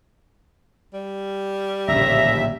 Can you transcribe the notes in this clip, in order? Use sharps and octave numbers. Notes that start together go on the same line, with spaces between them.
G3
D1 A#1 D#2 C#3 E5 A#5